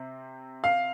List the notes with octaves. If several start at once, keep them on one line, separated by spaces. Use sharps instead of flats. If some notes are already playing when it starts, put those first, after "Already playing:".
Already playing: C3 C4
F5